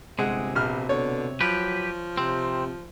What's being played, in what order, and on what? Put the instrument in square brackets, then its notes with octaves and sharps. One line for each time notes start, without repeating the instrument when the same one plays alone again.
[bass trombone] G1 [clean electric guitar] C3 [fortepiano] G#3 F#5 [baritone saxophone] G#4
[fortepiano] A#1 F6 [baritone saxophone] B2
[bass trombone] B2 [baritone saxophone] D3 [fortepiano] C#5
[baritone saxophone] F3 [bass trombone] F#3 [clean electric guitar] G4 B4
[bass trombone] C3 [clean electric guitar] C4